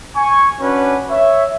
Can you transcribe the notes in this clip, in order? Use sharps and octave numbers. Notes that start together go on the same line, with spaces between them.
G#5 C#6
C#4 D4 F#4 B4
C#5 E5